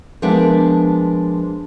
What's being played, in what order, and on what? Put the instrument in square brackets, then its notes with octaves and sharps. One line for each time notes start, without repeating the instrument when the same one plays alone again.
[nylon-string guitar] F3 G#3 B3 D4 A#4 E5